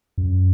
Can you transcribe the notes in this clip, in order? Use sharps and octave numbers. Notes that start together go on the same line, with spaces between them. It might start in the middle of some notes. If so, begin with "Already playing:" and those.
F#2